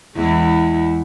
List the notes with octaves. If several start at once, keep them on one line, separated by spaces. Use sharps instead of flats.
E2 G#3 E4